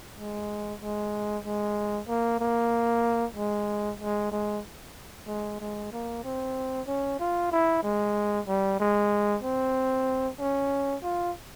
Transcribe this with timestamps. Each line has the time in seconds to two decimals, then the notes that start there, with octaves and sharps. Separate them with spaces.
0.16 G#3
0.81 G#3
1.44 G#3
2.08 A#3
2.40 A#3
3.36 G#3
4.00 G#3
4.31 G#3
5.27 G#3
5.60 G#3
5.92 A#3
6.24 C4
6.87 C#4
7.19 F4
7.52 E4
7.83 G#3
8.47 G3
8.80 G#3
9.43 C4
10.39 C#4
11.03 F4